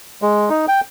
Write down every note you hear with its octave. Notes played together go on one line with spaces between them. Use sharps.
G#3
D#4
G5